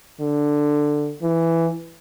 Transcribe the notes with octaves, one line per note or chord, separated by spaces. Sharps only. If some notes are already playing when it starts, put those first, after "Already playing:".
D3
E3